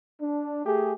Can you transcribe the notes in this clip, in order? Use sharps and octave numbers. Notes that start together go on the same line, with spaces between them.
D4
A3 G4 G#4